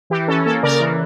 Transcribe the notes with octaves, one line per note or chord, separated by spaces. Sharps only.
E3 G4
C#4 A4
A#3 A4
C#3 A#4 D5
E3